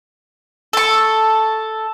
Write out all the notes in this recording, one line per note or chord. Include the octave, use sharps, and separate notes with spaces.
A4 C#6